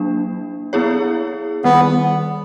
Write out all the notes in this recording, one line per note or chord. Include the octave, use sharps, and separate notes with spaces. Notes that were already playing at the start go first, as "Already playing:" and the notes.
Already playing: F#3 A#3 D4
B3 E4 G#4 C#5
D#3 G3 B3